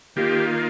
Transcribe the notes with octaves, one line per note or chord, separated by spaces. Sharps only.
D#3 A#3 F4 G4